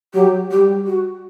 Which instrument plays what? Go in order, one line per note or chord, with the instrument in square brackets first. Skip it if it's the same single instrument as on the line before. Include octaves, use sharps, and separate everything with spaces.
[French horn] F#3 [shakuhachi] G4
[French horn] G3 [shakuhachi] G4
[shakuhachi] F#4